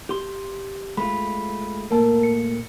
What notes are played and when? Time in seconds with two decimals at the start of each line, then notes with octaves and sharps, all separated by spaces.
0.09 G4 C6
0.97 G#3 A3 F4 B5
1.91 A#2 A3 A#3 A#4 A5
2.23 C#7